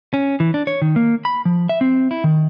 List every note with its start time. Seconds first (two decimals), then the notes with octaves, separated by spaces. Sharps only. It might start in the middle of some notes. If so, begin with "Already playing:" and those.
0.14 C#4
0.40 E3
0.54 D4
0.67 C#5
0.82 D#3
0.96 A#3
1.25 B5
1.45 F3
1.69 E5
1.81 C4
2.11 E4
2.24 D#3